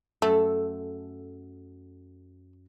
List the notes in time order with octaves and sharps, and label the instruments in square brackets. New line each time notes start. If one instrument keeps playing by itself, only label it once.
[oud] F#2 A4 [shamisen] A3